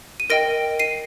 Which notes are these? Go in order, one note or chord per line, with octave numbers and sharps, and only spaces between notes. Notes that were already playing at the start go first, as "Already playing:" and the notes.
D#7
A#4 D#5 G5 A#6 D7
C7 D#7